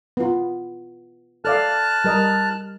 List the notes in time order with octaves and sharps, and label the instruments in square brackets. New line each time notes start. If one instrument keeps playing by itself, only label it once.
[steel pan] B3 F4
[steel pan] A4 D5 F5 [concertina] A5 F6 F#6
[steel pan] G3 A#4 D#5